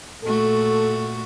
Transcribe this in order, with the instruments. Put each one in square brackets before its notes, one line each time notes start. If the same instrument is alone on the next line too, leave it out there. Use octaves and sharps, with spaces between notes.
[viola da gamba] A#2 A3 F#4 [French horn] A4